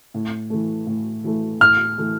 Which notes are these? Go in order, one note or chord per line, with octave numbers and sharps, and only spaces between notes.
A2
E3 A3
A2
E3 A3
A2 F6
E3 A3